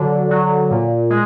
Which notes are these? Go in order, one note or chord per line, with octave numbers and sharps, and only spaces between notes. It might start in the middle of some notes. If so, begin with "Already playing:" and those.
Already playing: D3 F#3
F#3
A#2
G#3